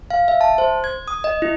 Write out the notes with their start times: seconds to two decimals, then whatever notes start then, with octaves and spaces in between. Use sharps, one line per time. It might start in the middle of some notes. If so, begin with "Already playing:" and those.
0.10 F5
0.28 E5
0.41 A5
0.58 C5
0.84 G#6
1.08 D#6
1.24 D#5
1.42 E4